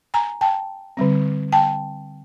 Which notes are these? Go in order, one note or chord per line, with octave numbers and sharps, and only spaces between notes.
G#5 A#5
G5 A5
D3 G3 C4
G5 A5